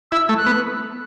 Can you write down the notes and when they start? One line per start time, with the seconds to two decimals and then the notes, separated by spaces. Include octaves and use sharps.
0.11 E4 E6
0.26 A3 E6
0.37 F#6
0.46 B3